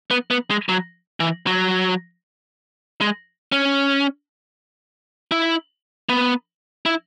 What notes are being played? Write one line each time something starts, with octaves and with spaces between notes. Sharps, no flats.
B3
B3
G#3
F#3
E3
F#3
G#3
C#4
E4
B3
E4